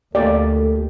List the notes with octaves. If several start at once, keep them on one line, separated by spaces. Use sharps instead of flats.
D2 A3 A#3 G4 A4 D5